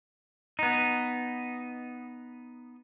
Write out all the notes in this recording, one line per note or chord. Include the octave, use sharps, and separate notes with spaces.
B3 D#4